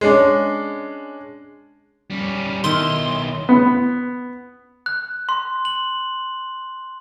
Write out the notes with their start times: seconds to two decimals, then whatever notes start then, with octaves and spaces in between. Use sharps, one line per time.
0.01 G#3 C#4 D4
2.10 G3 C#4
2.64 B1 D#3 E4 D#5 C6
3.49 B3
4.86 F#6
5.29 C6
5.65 F#7